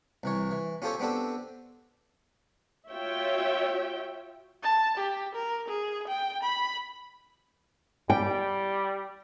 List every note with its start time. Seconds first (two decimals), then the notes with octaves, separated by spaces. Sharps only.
0.23 C2 E3 C#5
0.51 E3
0.82 C#4 F4 G4 A4 C5 C#5
1.00 B3 C4 D4 G4 A4
2.89 F4 F#4 C#5 E5 G5
4.63 A5
4.97 G4
5.35 A#4
5.68 G#4
6.08 G5
6.43 B5
8.10 G3 G5